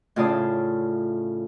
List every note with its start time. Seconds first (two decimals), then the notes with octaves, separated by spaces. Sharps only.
0.16 A2 C#3 F4 D5 A5 D#6